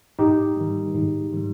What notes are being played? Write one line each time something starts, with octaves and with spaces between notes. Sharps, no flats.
G#2 D#4 G4
D#3 G3
G#2
D#3 G3